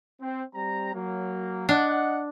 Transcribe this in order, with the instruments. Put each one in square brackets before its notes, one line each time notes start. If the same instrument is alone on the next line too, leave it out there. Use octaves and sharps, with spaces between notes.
[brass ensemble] C4
G3 C4 A#5
F#3 A#3
[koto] D4 [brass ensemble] D#5 F#5